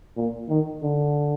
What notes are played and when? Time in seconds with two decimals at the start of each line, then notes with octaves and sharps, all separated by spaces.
0.17 A#2
0.49 D#3
0.83 D3